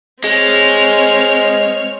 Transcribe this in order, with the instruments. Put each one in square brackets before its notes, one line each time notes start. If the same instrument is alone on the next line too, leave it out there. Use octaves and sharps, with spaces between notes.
[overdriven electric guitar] G#3 [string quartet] C4 C#5 F6